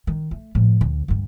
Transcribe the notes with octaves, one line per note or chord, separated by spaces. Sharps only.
D#3
A3
A2 F3
D2
D2 G2